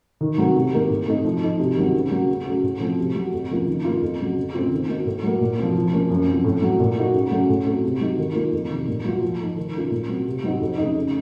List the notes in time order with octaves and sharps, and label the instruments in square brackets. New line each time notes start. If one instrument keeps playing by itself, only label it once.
[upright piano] D#3
F#3 A3 C4
C3
D#3 A#3
A2
A3 C4 D#4
F3
A3 D#4
C3
D#3 F#3 C4
C#3
F#3 A#3
C#3
A3 C#4 F#4
A2
F3 A3 C4
C3
F#3 C4 F#4
F2
C#3 F3 A#3 F4
D#3
A#3 F4
F2
C#3 F#3
C#3
A3 C4 F4
D#3
A#3 D#4 F#4
A2
F#3 A#3
A#2
F3 C4
F3
A#3 C#4
F#2
F3 C4
A2
F#3 A3
A#2
A3 D#4 F#4
C#3
F#3 A3 C#4
A2
A3 C4 F#4
C3
F#3 A3 D#4
D#3
A#3 F4
F2
C3 D#3
A#2
F#3 A#3 F4
F3
A3 D#4
D#3
A3 C#4 F4
A#2
F#3 C4
C3
F#3 C4 D#4 F#4
F2
C#3 A3 D#4
C#3